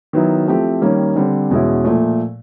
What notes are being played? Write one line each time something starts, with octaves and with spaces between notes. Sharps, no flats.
D#3 F#3 B3 E4
F3 A3 C4 E4 G4
D#3 G3 A#3 C#4
D3 G3 C4
E2 B2 G#3 C#4 E4
A#2 F3 A3